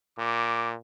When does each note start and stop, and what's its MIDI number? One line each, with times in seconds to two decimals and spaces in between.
0.19 0.76 46
0.19 0.69 86